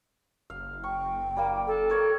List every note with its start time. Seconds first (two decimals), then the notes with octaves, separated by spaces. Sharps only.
0.50 F#1 F5
0.84 G5 C#6
1.36 G3 A#3 D6
1.67 A4
1.90 A#4 C#5 D5